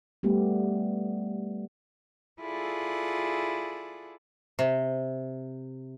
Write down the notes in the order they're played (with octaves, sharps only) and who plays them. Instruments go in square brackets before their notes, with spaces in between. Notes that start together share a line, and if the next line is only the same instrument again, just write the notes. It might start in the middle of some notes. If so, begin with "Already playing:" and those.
[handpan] G3 A3 B3 G4
[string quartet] E4 F4 G#4 A4 D5 F#5
[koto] C3